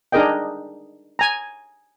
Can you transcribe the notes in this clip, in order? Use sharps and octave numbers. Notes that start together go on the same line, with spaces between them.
D4 D#4 G#4 A#4 D#5 G5
G#5 A#5